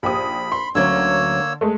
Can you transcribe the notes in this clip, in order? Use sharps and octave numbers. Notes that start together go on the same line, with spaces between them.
A#1 G4 B5 D#6
C6
D2 D3 F#3 A#3 C#4 C#5 E6 G#6
G#3 A3